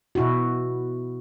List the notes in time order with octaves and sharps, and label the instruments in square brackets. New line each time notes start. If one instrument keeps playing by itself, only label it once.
[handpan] B2 E4 F#4